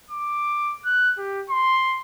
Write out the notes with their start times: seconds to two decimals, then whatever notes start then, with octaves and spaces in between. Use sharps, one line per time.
0.10 D6
0.85 F#6
1.18 G4
1.50 C6